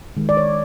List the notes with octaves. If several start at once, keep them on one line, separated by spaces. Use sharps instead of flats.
D#3 G#3
D5
C#5